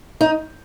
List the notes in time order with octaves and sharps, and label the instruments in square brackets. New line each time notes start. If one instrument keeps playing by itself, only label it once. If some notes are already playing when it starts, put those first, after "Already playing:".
[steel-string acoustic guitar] D#4